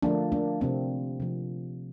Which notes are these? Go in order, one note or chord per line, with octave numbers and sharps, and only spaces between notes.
D3 F3 A3 A#3 D4
A#3 D4
C3 F3 A#3 C4
C3 F3 A#3